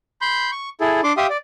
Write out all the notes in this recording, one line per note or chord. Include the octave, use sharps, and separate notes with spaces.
B5 C6 G6
C#6
E4 G#4 A4
D4 C6 D6
G4 E5 F5 G5 C6 D#6
D5